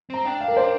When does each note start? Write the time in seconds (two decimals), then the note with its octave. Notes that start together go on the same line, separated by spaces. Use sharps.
0.10 C4 A#5
0.25 D4 G5
0.40 F5
0.48 A#4
0.57 C5